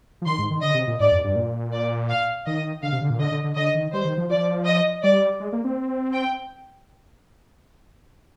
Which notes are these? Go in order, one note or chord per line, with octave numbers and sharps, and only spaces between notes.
F3
D#3 C6
G#2
D#3
D3 D#5
C3
A#2
G#2 D5
F2
G2
A#2
D5
F5
D#3 D#5
D3 F5
C3
D3
A#2
D3 D#5
D3
D3
D3 D#5
D#3
G3 C5
D#3
F3
F3 D5
D#5
G3 D5
G#3
A#3
C4
G5